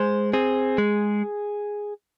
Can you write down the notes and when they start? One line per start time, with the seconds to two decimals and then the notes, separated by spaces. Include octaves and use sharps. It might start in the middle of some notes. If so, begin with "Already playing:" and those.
Already playing: G#3 C5
0.33 C4 G#4
0.78 G#3